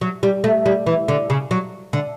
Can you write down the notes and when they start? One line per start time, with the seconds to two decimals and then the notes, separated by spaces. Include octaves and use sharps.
0.01 F#3
0.23 G3
0.44 A3
0.66 G3
0.86 E3
1.08 D3
1.30 C#3
1.51 F#3
1.93 D3